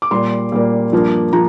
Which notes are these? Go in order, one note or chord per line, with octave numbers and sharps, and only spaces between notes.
D6
A#2 G3 A#3 C6
A#2 G3 A#3
G2 F3 A#3
F3 A#5